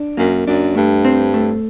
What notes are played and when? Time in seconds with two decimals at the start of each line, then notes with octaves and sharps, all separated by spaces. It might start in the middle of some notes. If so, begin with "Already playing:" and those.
Already playing: D4
0.17 F#2 A#3
0.47 F#2 D4
0.75 G2 A3
1.05 C4
1.34 A3